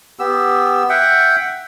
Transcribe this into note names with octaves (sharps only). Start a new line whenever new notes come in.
B3 G4 E6
E5 F#5 G5